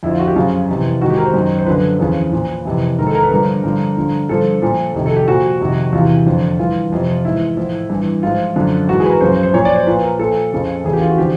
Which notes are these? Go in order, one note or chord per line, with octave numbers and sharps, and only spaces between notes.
F2 D3 F3 E4
F4
F#4
G4
F#2 C#3 F3 F4
F2 C3 E3
G#2 D#3 F#4
G4
A#4
C5
F#2 D#3
C5
F#2 D3 F3 B4
E2 C#3 F3
A#2 F3
F2 C3 E3
G#2 D#3 A#4
A4
A#4
B4
G2 D3 F3 A#4
G2 D3 F3
G2 D3 F3
G2 D3 F3 A4
A#2 F3
F2 C3 D#3
A4
G4
A#2 F3 F#4
F2 C3 D#3
E2 C3 E3 F4
F2 D3 F3
G2 E3 F4
F2 C3 F3
G#2 E3 E4
A2 F3
G2 E3
G#2 F3 F4
F#2 D3 F3
G#2 E3 F#4
G#4
B4
A#4
F#2 C#3 F3 C5
C5
C5
A#2 F3 C#5
D5
C5
A#2 F3 B4
A#4
A#2 F3 A4
F2 C#3 F3
E2 C#3 E3 G#4
G4
F4
F#4
D3 F3 G4